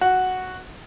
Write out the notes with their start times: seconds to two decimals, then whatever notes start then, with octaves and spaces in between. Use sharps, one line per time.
0.01 F#4